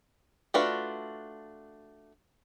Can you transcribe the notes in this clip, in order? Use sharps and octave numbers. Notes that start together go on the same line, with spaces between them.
A3 D4 F4 F#4 B4